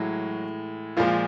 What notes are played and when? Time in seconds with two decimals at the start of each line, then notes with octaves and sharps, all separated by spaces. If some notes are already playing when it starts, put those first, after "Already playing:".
Already playing: A2 E3 F#3 G#3 F#4
0.97 A#2 F3 G#3 F4